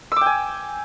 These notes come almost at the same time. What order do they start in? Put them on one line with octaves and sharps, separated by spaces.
E6 D6 G5 G#5